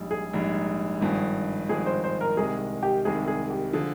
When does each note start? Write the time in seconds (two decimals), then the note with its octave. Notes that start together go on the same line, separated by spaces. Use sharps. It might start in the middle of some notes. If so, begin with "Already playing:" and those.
Already playing: A#1 G#2 G3
0.11 G#4
0.33 A#1 G#2 G3
1.01 G#1 G2 F3 G#3
1.69 G#1 G2 F3 G#3 G#4
1.86 C5
2.04 C5
2.21 A#4
2.37 C2 C3 D#3 G#3 G#4
2.83 G4
3.05 C2 C3 D#3 G#3 G#4
3.28 G#4
3.50 G4
3.73 D3 F3 G#4